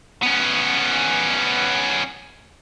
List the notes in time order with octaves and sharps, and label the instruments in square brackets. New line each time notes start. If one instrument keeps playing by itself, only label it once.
[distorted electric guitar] B3 C#4